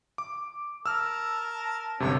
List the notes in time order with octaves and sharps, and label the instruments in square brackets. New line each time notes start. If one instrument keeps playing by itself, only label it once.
[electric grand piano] D6
[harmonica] A#4 A5 [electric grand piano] E6 F6
[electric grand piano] G1 F#2 C3 [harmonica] C#4 C#5